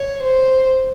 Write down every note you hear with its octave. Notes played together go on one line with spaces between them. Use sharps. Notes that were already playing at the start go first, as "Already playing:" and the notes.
Already playing: C#5
C5